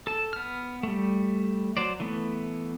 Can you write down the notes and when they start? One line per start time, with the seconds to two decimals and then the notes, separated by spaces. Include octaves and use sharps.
0.07 A4 A5
0.33 B3 F6
0.83 G3 A3
1.77 F#3 C5 D5
2.00 E3 A3 B3